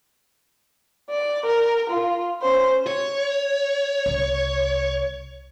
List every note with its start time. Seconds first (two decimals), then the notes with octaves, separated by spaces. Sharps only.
1.10 D5
1.45 A#4
1.90 F4
2.42 C#4 C5
2.87 C#5
4.06 C2